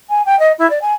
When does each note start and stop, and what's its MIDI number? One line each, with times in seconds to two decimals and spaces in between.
0.09 0.21 80
0.25 0.37 79
0.39 0.52 75
0.58 0.68 64
0.70 0.78 74
0.81 0.93 80